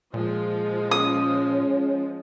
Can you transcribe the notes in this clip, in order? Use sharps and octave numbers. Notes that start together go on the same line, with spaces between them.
A#2 F3 G#3
C#4 D#6